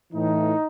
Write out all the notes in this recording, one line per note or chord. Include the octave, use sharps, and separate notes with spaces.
A2 E3 D#4